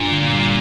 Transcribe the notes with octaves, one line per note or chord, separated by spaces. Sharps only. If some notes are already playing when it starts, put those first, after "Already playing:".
Already playing: G2 A#2 D4
D3
G3